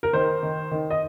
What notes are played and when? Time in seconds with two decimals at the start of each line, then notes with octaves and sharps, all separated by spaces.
0.03 A#4
0.13 D#3 C5
0.43 D#3
0.71 D#3
0.90 D#5